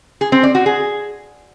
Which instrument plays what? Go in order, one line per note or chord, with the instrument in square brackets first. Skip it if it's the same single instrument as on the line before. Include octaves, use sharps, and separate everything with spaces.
[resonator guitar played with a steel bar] G#4
C4
D5
F#4
G#4